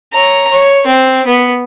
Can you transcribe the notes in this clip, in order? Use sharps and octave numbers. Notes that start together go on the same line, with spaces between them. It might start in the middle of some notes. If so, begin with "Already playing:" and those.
C#5 A#5
C#5
C4
B3